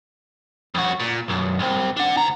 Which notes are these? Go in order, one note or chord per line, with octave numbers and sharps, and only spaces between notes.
F2 F#4
A#2
B1 F#2
C2 C4
D4 F#5
D2 A#5